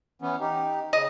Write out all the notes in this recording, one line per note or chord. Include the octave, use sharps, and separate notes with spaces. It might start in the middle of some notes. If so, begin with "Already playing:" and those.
E3 B3 C#4
D#4 G4
C#3 D#5